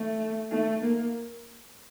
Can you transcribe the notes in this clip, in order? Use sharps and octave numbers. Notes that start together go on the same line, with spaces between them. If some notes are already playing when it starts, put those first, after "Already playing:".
Already playing: A3
A3
A#3